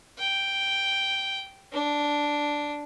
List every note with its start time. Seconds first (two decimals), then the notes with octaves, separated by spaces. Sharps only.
0.18 G5
1.72 D4